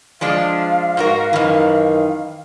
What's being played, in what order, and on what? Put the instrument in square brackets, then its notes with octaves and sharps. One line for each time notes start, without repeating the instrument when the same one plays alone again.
[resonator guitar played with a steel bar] F3 G#3 D4 [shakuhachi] F5
[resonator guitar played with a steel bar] G#2 F#4 A#4
[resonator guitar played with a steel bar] F#2 E3 [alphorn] D#3